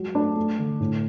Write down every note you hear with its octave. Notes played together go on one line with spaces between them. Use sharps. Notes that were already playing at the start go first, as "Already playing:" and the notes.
Already playing: F#3 G#3
A3 D4
A3
D3
A2